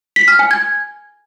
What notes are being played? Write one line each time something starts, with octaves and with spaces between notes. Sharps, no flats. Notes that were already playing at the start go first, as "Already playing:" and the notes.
B6
F6
G#5
G#6